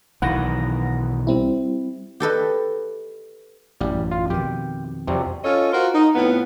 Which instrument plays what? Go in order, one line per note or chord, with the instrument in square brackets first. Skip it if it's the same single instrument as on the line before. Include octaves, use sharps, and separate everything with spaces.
[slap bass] B1 D#3 E3 [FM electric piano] F#5 A#6
[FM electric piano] G3 C4 E4
[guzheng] G4 A4 B4 D#5
[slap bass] A1 F#2 [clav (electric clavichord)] G3
[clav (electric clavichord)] F4
[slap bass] F2 B2 D#3 [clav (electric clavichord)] G4
[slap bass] F2 [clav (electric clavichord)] C3 F#3 G3
[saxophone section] C#4 F4 A4 C#5 D#5
F4 F#4 A#4 C5
D#4
F2 A2 B3